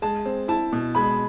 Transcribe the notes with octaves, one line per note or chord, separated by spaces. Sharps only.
G#3 A5
C4
E4 A5
B2
G#3 B5